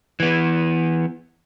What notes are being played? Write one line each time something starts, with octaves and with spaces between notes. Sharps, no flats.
E3 B3